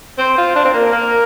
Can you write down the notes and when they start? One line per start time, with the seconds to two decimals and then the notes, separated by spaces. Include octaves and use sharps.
0.18 C4 C5
0.38 F4
0.56 D4
0.65 C4
0.74 A#3 A#4
0.92 A#3